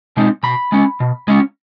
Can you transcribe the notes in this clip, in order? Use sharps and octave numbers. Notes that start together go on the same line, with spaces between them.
B2 G#3 C4 D#4
B2 B5
G#3 C#4
B2
G#3 C#4